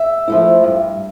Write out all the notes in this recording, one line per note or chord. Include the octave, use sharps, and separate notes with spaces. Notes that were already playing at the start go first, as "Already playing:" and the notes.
Already playing: E5
F3 A3 E4
G2